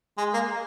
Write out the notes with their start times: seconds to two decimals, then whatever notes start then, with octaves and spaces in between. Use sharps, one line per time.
0.18 G#3
0.33 A#3